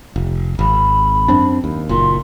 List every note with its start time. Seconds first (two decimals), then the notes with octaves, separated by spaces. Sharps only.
0.16 F1
0.59 G#1 B5
1.28 F#2 C4 D4
1.64 D#2
1.89 F#1 A#2 C6